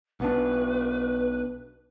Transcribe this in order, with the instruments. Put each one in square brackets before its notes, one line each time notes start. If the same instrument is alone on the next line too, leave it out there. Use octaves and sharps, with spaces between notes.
[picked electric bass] B1 B3 D4 [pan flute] B4